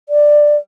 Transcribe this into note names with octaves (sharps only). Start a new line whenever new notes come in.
D5